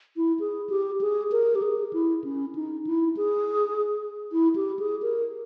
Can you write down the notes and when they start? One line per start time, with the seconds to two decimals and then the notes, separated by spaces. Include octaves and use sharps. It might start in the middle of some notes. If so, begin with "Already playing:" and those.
0.17 E4
0.40 G#4
0.70 G4
1.01 G#4
1.32 A#4
1.55 G4
1.62 G#4
1.93 E4
2.24 C#4
2.55 D#4
2.87 E4
3.17 G#4
4.32 E4
4.56 G4
4.79 G#4
5.02 A#4